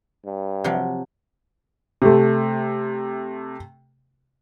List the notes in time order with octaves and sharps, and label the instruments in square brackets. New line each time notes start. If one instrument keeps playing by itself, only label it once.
[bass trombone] G2
[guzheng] C3 F3 F#3
[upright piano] C3 A3